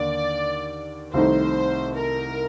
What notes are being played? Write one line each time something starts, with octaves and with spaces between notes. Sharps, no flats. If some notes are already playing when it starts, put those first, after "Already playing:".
Already playing: D#2 D3 A#3 D5
C2 C3 D#3 A3 D#4 C5
A#4